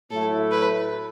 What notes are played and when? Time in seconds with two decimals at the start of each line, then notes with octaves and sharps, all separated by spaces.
0.11 A2 F#3 A3 E4 A4
0.52 B4